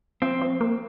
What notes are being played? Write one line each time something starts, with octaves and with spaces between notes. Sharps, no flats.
F3 C4
F3
A#3